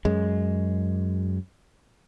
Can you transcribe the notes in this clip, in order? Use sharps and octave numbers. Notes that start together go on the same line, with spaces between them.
F#2 G#3